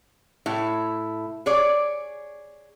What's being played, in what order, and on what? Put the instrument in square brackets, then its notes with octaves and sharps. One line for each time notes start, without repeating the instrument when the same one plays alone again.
[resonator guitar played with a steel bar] A2 E4
G#4 C#5 D5